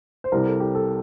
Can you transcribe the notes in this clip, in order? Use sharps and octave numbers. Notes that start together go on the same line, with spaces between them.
C5
C2 C3 G3 A#4
A4
G4
A4